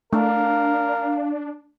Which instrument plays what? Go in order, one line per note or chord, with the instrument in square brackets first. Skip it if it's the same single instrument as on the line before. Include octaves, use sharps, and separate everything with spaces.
[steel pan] A3 [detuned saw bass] D4 [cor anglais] A#4 [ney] F5